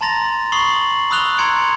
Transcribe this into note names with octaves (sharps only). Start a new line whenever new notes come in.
A5 A#5 C6 A6 A#6 F7
B5 C#6 D#6 C7 F#7 G7
B5 D#6 E6 F#6 F7 G7
A#5 C6 G#6 C#7 D7